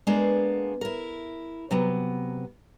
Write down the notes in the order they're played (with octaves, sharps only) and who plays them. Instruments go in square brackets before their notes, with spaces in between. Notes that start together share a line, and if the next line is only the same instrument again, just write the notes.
[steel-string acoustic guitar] G#3 A#3 B3 D4
E4 A#4
C3 F#3 B3